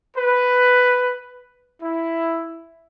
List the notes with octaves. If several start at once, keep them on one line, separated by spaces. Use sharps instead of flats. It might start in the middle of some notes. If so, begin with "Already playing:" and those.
B4
E4